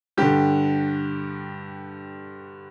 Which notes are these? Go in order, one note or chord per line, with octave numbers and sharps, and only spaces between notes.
G2 D3 G4